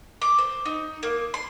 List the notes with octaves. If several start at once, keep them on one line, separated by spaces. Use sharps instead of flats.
D6
C5
D#4
A#3
C6